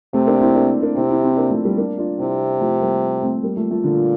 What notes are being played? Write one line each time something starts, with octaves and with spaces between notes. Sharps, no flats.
C3 A3 C4
A#3 D4
C4 E4
A#3 D4
A#3 D4
C3 C4 E4
C4 E4
C4 E4
A#3 D4
F3 A3
G3 A#3
A#3 D4
D4 F4
C3 C4 E4
F3 A3
G3 A#3
A3 C4
G3 A#3
F3 A3
F3 A3
A#2 D3 F3